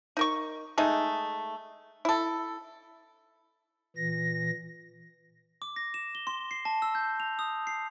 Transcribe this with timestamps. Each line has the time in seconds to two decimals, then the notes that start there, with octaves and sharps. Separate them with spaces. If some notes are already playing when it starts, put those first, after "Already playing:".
0.17 D#4 A#4 C#6
0.78 G#3 A3 D#4
2.05 E4 A4
3.96 A#2 E3 A#6
5.62 D6
5.76 A#6
5.94 E7
6.15 G7
6.27 C6
6.51 C7
6.65 A5
6.82 E6
6.95 G6
7.20 F7
7.39 D#6
7.67 C7